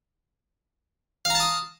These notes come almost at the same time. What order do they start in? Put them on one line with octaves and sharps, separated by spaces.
F5 A#5 A5 D#6